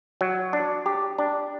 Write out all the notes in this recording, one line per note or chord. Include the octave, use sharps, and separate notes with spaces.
F#3
D4
G4
D4